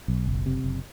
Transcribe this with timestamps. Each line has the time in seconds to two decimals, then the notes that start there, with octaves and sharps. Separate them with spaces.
0.08 B1
0.27 F#1
0.46 C3
0.64 F#1